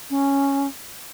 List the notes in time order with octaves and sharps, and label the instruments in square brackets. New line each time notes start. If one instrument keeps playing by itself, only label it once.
[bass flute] C#4